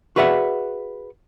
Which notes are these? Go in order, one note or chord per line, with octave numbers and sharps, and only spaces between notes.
F#4 G#4 B4 D5 E5 F#5